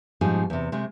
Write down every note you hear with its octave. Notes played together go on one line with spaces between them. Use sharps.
G#2 B2 F3 G3 D#4 G#4
E2 C3
C3 G#3 A3